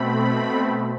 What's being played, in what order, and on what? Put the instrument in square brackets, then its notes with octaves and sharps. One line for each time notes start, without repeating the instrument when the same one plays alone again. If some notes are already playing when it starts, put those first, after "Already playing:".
Already playing: [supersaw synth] B2 A3 C4 B5